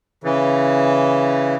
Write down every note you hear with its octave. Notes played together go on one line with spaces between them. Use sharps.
C#3 E3